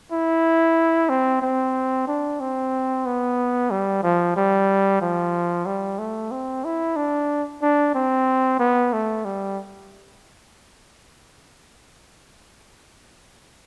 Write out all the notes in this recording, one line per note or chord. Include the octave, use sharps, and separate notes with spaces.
E4
C4
C4
D4
C4
B3
G3
F3
G3
F3
G3
A3
C4
E4
D4
D4
C4
B3
A3
G3